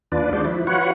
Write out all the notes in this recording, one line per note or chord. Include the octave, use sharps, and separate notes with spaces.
D#2 D4 F4 B4 D5
G#3 D4 F#4 C5 D5
F3 E4
F4 F#4 B4 C#5 F#5